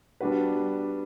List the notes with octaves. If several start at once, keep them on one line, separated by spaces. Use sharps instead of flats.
G3 B3 D4 F#4 B4